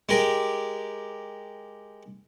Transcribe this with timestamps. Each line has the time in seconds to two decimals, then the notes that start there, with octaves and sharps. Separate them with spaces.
0.09 G#3 G4 A#4